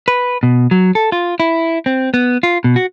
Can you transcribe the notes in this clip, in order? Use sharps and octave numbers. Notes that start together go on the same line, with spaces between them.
B4
B2
F#3
A4
F4
E4
C4
B3
F4
B2
F#4